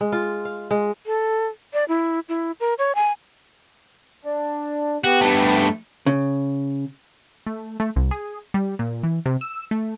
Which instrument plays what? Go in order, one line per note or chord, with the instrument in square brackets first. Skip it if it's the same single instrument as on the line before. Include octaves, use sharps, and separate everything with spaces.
[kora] G#3
F4
F5
G#3
[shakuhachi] A4
D5
E4
E4
A#4
C#5
G#5
[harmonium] D4
[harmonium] B3 G4 [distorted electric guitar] F#4
[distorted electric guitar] G2 A3
[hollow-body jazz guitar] C#3
[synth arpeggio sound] A3
A3
C2
G#4
G3
A#2
E3
C3
E6
A3